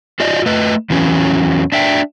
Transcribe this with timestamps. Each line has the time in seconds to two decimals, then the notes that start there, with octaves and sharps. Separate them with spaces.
0.20 F4 F#4 D5 D#5
0.46 A3 B4 D#5
0.90 E2 E3 F#3 C#4
1.72 D4 E5 G5